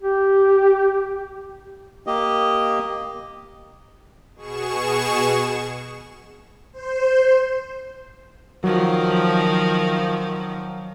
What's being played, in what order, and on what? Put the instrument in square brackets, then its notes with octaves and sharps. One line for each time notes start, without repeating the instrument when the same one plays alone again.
[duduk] G4
[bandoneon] A#3 G4 D#5
[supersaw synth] B2 G#4 C#6 E7
[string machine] C5
[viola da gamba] D#3 F3 [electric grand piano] F#3